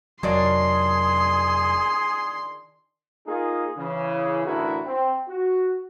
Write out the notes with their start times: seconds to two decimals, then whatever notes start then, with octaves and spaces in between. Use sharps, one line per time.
0.23 F1 D#3 F#3 D4 F4 G#4 C6
3.27 A#3 D#4 F4 G#4
3.77 C#3 E3
4.46 A1 D2 D3 E4 F#4 A#4
4.85 C4
5.28 F#4